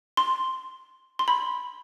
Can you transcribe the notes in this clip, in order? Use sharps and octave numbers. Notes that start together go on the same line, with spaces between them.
C6
C6
B5